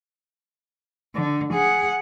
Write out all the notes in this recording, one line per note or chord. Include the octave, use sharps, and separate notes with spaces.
D3
G#4 F#5